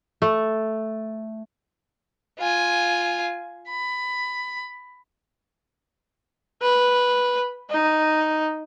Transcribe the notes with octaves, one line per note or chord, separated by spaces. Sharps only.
A3
F4 G#5
B5
B4
D#4